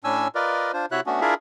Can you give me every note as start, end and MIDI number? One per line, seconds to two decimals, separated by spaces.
0.04 0.28 45
0.04 0.28 61
0.04 0.28 62
0.04 0.28 80
0.04 0.28 88
0.35 0.72 65
0.35 0.72 70
0.35 0.72 71
0.35 0.72 74
0.35 0.72 75
0.74 0.86 62
0.74 0.86 65
0.74 0.86 72
0.92 1.00 48
0.92 1.00 64
0.92 1.00 66
0.92 1.00 73
0.92 1.00 76
0.92 1.00 90
1.06 1.21 57
1.06 1.21 59
1.06 1.21 61
1.06 1.21 62
1.06 1.21 66
1.21 1.34 62
1.21 1.34 64
1.21 1.34 65
1.21 1.34 68
1.21 1.34 70
1.21 1.34 76